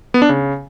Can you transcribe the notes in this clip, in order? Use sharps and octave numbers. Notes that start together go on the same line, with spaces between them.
B3
D4
C#3